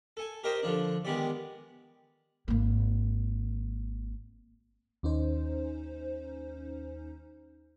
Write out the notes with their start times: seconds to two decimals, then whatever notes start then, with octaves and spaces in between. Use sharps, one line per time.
0.17 A4 G#5
0.44 G4 A#4 C5 D#5 G5
0.62 D3 F3 D4
1.05 D#3 G#3 B3 G4 D5
2.48 G#1 A#3
5.03 D#2 C#4 D#4 C5